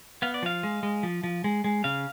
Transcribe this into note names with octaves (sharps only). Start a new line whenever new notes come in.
B3 F5
D5
F3 F5
G#3
G#3
F3
F3
G#3
G#3
C#3 F5